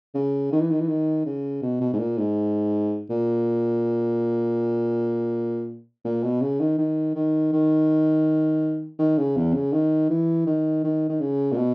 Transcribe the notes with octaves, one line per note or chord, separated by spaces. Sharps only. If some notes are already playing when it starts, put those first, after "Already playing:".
C#3
D#3
E3
D#3
E3
D#3
C#3
B2
B2
G#2
A#2
G#2
A#2
A#2
B2
C#3
D#3
D#3
D#3
D#3
D#3
C#3
E2
C#3
D#3
E3
D#3
D#3
D#3
C#3
A#2
B2